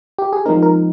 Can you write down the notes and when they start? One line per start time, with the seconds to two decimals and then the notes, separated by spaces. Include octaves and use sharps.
0.18 G4
0.33 G#4
0.46 F3 G#3 C4 D#4 A#4
0.62 A#4